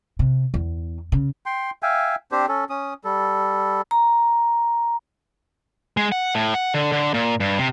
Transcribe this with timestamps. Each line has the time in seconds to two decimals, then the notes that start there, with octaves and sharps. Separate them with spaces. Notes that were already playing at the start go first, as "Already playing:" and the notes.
0.19 C3
0.54 E2
1.12 C#3
1.46 G5 C6
1.83 E5 F5 G5 G#5
2.32 C4 D4 G4 C5
2.49 C#4 A4
2.70 C#4 D#6
3.05 G3 A4
3.91 A#5
5.97 G#3
6.12 F#5
6.35 A2
6.54 F#5
6.74 D3
6.92 D3
7.14 A#2
7.40 G2
7.58 C3